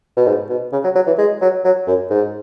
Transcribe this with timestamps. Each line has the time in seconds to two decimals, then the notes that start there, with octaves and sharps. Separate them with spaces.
0.17 B2
0.26 G#2
0.49 B2
0.72 C#3
0.84 F#3
0.95 F#3
1.07 E3
1.18 G#3
1.41 F#3
1.64 F#3
1.87 F#2
2.10 G#2